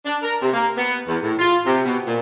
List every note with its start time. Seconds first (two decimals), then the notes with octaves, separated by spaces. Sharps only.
0.05 D4
0.22 A#4
0.41 C3
0.54 A#3
0.77 B3
1.07 E2
1.23 A2
1.39 F4
1.65 C3
1.85 B2
2.06 A#2